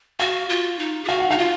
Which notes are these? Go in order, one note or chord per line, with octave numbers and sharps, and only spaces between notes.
F#4 F5
F4
D#4
G#4
F#4 F5
F#5
D#4 F5
F4